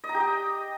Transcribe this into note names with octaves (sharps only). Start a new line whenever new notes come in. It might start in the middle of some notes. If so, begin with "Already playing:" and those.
D#5
A#5
G4
G5